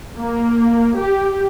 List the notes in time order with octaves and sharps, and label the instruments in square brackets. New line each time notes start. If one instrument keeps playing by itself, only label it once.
[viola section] A#3
G4